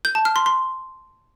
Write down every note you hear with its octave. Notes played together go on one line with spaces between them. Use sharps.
G6
A5
F6
C6
C6